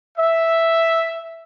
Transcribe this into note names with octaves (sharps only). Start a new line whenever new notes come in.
E5